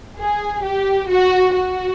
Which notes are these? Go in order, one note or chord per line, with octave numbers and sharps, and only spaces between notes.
G#4
G4
F#4
F#4